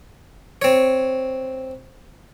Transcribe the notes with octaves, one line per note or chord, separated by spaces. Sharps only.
C4 C#5